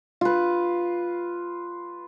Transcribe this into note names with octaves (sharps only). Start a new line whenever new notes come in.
F4 B4